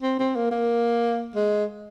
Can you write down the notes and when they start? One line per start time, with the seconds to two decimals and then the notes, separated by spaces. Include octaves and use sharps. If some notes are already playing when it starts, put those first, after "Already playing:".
0.03 C4
0.19 C4
0.36 A#3
0.51 A#3
1.35 G#3